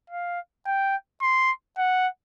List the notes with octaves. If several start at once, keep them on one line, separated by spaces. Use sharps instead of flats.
F5
G5
C6
F#5